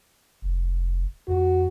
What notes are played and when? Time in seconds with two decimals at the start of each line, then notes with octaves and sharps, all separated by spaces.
0.42 F1
1.28 F2 F#4